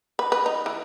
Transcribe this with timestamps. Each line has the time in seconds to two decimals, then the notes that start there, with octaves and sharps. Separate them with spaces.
0.19 B4
0.32 B4
0.46 D#4
0.66 E3